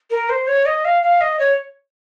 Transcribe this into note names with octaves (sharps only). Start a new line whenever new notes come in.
A#4
C5
C#5
D#5
F5
F5
D#5
C#5